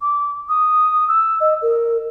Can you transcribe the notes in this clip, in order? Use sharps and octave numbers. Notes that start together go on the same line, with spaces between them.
D6
D#6
E6
D#5
A#4